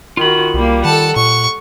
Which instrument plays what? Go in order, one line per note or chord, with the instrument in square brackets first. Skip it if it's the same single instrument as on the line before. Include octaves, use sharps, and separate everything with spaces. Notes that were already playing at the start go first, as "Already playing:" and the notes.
[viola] D#3 F#4 [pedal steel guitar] F4 B5
[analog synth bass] C2 [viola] G3 A#3
[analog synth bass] D#3 [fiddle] A4 A5 [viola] F#5
[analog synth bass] A#2 [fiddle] C#6